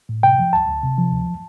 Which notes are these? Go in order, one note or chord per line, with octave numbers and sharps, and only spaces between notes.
A2
C3 G5
F3
D2 A5
D2
C3
F3
D2